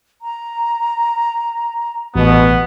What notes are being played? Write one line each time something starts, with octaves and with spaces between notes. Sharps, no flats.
A#5
A1 B2 B3